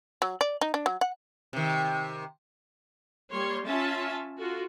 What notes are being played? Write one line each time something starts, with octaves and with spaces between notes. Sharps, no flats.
F#3
D5
D#4
D4
F#3
F#5
C3 D#3
G3 A#3 C#5 C6
C#4 F4 E5 A5
F4 F#4 A4